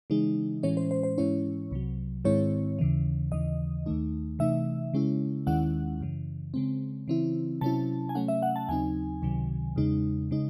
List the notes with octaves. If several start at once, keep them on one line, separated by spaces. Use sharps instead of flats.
C#3 E3 G#3 D#4
A2 E3 G#3 C#4 C#5
C5
C5
C5
G#2 E3 G#3 C#4 E4 C#5
C2 C3 F#3
G#2 D#3 G#3 C4 E4 C#5
D#2 C#3 E3
D#2 C#3 E3 D#5
D#2 D#3 A3 D#4
C3 E3 A3 D#4 E5
C#3 G#3 C#4 E4
D#2 D#3 G#3 C#4 E4 F#5
F#2 C#3 E3
C#3 G#3 C4
C#3 E3 C4 E4
C3 F#3 C#4 E4 A5
G#5
C3 F#3 A3 C#4 F#5
E5
F#5
A5
D#2 C#3 F#3 C4 D#4 G#5
C#2 C3 D#3 F#3
E2 C#3 G#3 D#4
C#3 G#3 D#4